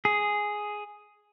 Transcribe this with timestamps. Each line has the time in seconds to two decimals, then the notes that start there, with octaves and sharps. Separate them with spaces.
0.05 G#4